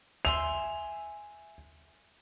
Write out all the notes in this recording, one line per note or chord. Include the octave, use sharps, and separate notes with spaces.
E5 G#5 C6 F7